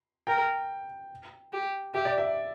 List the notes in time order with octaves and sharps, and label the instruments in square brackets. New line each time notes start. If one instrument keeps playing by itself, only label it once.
[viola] A#4 [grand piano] G5
[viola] G4
[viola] G4 [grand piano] E5
[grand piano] D5
E5